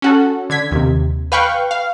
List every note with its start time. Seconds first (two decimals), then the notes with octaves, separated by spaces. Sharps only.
0.02 C#4 F#4 A4
0.50 D3 G#6 B6
0.71 D#2 C3
1.32 B4 F5 G5 C#6 F#6
1.71 F5